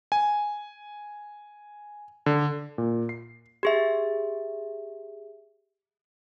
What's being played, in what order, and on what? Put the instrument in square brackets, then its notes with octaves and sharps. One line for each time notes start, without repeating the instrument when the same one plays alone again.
[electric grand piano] G#5
D3
A#2
C7
[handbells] G4 G#4 E5